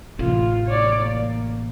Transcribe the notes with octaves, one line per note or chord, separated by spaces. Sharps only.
A1 C3 F4
C#5 D5
A#3